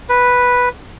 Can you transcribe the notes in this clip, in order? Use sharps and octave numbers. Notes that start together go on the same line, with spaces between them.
B4